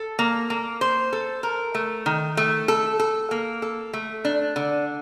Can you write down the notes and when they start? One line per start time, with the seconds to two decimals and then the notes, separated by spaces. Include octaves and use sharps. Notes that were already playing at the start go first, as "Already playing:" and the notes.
Already playing: A4
0.19 A#3
0.50 A#3
0.81 C5
1.13 A4
1.43 A#4
1.75 A3
2.06 D#3
2.37 A3
2.68 A4
2.99 A4
3.31 A#3
3.62 A4
3.93 A3
4.25 D4
4.56 D3